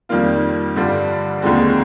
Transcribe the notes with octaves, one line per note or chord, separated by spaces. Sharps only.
F2 D#3 G3 A#3 F4
G2 D3 G3 D4 F4
D#2 D3 F3 G#3 C4